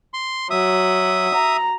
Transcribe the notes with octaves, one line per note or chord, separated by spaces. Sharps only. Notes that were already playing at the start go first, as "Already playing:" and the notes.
C6
F#3 E5 D#6
A#5